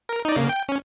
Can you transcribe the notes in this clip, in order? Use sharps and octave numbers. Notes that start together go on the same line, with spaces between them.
A#4
D#4 D5
C#3 A#3
G5
C#4